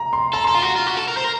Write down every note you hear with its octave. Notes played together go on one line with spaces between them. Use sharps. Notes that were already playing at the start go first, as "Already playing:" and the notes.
Already playing: A#5
C6
A4 A#5
C6
A4
F4 A#5
F#4
F4
F#4
A4
A#4
C5
A#4